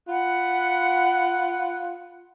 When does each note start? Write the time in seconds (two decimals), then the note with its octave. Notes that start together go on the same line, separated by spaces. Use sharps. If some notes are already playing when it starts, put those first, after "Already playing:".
0.08 F4 F#5 B5 F#6